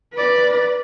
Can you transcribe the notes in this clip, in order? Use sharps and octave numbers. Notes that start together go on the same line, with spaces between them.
B4 D5